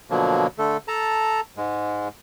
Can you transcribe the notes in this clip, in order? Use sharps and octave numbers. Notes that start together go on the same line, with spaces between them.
B2 D3 F3 F#3 A#3
D3 A3 A4
A4 A5 A#5
G#2 G#3